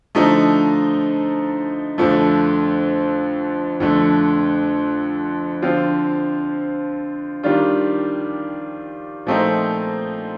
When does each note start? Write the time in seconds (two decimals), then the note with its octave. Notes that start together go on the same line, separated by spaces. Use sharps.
0.15 D3 F3 A3 D#4
1.98 F2 D3 F3 A3
3.80 F2 D3 A3
5.62 D3 F3 C4 F4
7.43 D#3 G3 D4 F4
9.26 A#2 F3 A3 C4 D#4